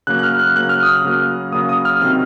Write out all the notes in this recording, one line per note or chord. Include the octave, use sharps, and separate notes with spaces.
C#3 F#3 A#3 F#6
F#6
F6
F#6
C#3 F#3 A#3 F#6
F6
D#6
F6
C#3 F#3 A#3
C#3 F#3 A#3 D#6
D#6
F6
C3 D#3 F#3 C4 F6